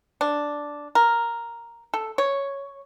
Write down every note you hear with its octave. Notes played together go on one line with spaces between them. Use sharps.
D4
A#4
A4
C#5